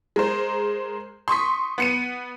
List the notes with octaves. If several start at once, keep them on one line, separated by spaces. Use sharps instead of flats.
G#3 A#4 C5
C6 C#6 D#6 B6
B3 C#7 D#7